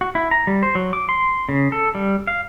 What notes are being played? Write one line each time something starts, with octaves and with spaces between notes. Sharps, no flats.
F#4
E4
A#5
G3
C5
F#3
D6
C6
C#3
A4
G3
F5